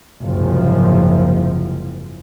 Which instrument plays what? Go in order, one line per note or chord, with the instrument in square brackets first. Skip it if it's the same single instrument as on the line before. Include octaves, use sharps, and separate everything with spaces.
[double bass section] F#1 C2 G#2 F3